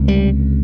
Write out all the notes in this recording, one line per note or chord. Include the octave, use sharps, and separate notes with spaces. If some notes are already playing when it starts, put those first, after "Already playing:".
Already playing: C#2 C3
G3